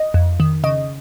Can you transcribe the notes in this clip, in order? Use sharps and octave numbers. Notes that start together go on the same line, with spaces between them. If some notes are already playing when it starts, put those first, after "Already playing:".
Already playing: D#5
F2
D#3
C#3 D#5